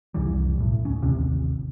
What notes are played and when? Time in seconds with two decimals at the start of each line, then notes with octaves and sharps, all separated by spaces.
0.14 C2 F2 E3 G3
0.58 B1 A2
0.85 D2 C#4
1.02 A1 D#2 C3